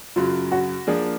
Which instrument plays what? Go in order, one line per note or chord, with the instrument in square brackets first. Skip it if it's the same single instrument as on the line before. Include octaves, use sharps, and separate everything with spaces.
[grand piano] F#2 C#3 F#3 [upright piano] F4
[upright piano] F#4
[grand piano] F3 A#3 D4 [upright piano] G#4